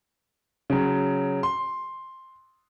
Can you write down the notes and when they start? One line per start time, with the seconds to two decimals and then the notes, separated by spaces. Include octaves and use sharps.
0.70 C#3 F#3
1.43 C6